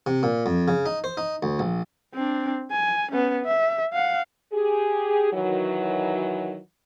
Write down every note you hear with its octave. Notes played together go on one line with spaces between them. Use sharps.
C3
A#2
F2
C#3
D#4
C5
D#4
D2
A#1
C4 D4
G#5
B3 C#4
E5
F5 F#5
G4 G#4
D#3 E3 F#3